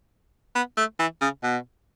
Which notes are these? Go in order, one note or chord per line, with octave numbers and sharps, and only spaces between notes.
B3
A3
E3
C#3
B2